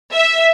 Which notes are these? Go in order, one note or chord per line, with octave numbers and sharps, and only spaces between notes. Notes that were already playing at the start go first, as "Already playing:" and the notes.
E5